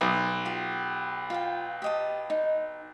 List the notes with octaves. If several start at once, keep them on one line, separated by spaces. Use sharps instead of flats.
B1 D#6
F4 G4
F4 F5 G5
G4 D#5 A5
D#4